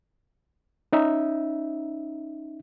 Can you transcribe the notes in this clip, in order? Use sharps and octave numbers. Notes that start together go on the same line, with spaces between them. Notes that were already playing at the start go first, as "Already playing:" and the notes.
C#4 D#4 E5